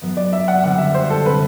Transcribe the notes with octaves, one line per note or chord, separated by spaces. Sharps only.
F#2 F#3 B3
D5
E5
F#5
F#2 D3 G3 C4 F#5
E5
C5
A4
C3 G3 C4 B4